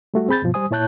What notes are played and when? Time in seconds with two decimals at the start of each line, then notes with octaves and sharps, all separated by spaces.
0.14 G3 A3 F#4
0.29 C4 G#4 B5 G6 A6
0.42 G2 B2 F3
0.54 G3 C5 G#5 D#6
0.71 A#2 E4 C#5 A5 F#6 G6